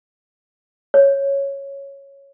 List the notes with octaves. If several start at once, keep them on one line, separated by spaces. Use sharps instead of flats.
C#5